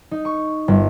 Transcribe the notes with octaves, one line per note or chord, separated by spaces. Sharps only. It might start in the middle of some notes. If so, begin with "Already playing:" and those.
D#4
C#6
G1